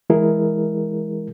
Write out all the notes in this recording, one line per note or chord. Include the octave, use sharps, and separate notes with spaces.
E3 G#3 E4 G#4 A#4